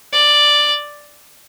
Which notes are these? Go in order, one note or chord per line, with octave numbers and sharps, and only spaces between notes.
D5